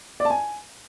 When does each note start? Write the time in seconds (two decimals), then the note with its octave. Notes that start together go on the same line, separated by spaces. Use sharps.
0.20 D5
0.25 A5
0.30 G#5